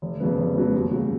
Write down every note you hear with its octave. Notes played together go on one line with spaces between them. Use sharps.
F1
F2 C#3 F#3 B3
F1
F2 C#3 F#3 B3
D#2
C#3 F#3